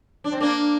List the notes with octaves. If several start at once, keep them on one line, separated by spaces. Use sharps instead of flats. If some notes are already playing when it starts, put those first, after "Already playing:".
D4
C4
A#3 D4